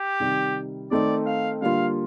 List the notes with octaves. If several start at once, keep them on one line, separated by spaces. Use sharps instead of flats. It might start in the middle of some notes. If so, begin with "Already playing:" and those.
Already playing: G4
C3 D#3 G3
D#3 A3 C4 D#4 D5
F5
D3 G3 A#3 F4 F5